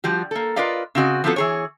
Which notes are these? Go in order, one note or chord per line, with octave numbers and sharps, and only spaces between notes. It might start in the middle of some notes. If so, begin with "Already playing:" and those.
F3 G3 F#4
A#3 A4
F4 A#4 B4 D5 D#5 F5
C#3 C4 F#4 D#5
F3 B3 C4 F4 F#4 A4
E3 G#4 C#5